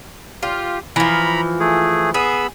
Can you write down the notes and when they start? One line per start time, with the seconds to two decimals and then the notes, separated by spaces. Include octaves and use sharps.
0.43 F4 G4
0.96 E3 F3 A#5 B5
1.60 A3 G#4
2.14 B3 G#4 B5 E6